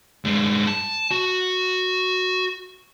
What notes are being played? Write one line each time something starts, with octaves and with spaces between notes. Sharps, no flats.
G2 G#3
A5
F#4